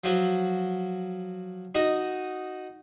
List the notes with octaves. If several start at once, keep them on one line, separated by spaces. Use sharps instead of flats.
F3 F#3 F#4
D#4 F#4 D#5